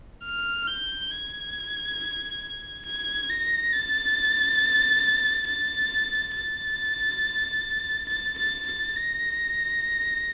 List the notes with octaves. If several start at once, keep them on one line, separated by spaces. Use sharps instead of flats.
F6
G6
G#6
G#6
A#6
A6
A6
A6
A6
A6
A6
A#6